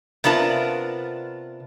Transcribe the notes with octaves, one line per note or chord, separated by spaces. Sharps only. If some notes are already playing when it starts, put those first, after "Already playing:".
C3 B3 D4 F4 A#4 A5